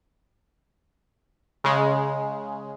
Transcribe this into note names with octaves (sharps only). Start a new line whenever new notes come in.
C#3 G#3